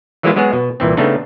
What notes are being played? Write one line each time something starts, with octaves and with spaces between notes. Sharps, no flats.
E3 F#3 G#3 A#3 E4 F4
F#3 G#3 B3 F#4 G#4
B2
C2 A#2 E3 C4
C#3 A3 B3 C4 D4 D#4